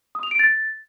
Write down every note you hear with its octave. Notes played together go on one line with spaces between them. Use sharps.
D#6
F7
D7
A6